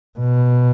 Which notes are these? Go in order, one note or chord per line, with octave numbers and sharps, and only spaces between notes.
B2